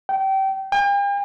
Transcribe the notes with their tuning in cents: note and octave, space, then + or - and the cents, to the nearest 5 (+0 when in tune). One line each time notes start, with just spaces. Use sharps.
G5 -25
G5 +45